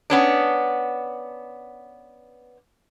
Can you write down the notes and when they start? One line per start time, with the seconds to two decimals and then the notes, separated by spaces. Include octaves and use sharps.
0.10 B3 C#4 D4